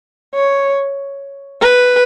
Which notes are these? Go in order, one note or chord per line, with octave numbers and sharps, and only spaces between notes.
C#5
B4